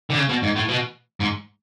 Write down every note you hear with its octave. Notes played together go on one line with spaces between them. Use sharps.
D3
C#3
B2
G#2
A2
B2
G#2